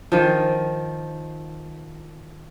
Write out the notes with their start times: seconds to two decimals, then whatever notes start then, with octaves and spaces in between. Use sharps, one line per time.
0.12 D#3 F3